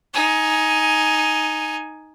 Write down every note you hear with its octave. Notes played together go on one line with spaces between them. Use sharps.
D#4 G#5